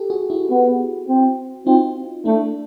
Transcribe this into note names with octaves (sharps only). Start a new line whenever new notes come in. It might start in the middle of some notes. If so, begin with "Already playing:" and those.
Already playing: G4 A4
F#4 G#4
E4 F#4
B3
C4
C4 D#4 F4
A3 D4 E4